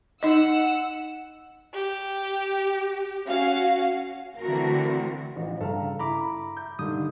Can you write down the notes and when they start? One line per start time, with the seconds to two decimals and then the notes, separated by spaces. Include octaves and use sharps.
0.23 D#4 D#5 F#5 E6
1.74 G4
3.28 C#4 F#4 F5
4.40 D3 E3 A3 C4 F#4 A#4
5.36 A1 F3
5.61 G2 C#3 A4 F5 A#5
6.00 E4 A#5 B5 D6
6.57 G6
6.79 G2 D3 D#3 D#6